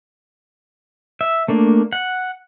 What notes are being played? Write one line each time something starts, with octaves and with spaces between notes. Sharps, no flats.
E5
A3 A#3 D4
F#5